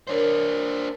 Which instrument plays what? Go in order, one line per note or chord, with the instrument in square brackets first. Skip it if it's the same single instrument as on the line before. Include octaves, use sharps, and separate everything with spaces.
[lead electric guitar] D4 C5 [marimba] A#4 C#5